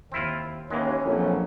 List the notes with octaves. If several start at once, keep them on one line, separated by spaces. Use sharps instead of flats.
D#2 C4 E4 F4
D#2 E3 G#3 C#4
A#1 F2 F#3